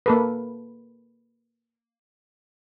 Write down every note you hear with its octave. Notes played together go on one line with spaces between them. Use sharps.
A#3 A4 B4